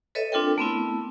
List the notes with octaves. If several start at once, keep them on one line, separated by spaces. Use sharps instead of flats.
A4 B4 C#5 D#5 E5
C4 D4 F4 A4 A#4 G5
A3 B3 C4 E4